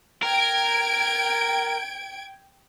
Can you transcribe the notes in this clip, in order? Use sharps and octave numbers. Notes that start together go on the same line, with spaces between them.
A#4 G5 G#6 D7